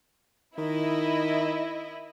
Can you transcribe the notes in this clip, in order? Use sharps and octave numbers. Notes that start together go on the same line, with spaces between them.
D#3 E4 D#5